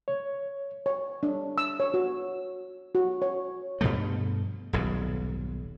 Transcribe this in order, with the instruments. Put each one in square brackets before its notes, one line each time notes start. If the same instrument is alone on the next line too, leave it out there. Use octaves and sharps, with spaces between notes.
[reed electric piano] C#5
[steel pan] C#5
D4
E6
C#5
F#4
F#4
C#5
[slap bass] G2 B2 F3 A3
D#1 B1 G#2